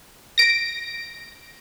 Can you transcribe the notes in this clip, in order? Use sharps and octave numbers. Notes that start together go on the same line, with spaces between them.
A#6 D7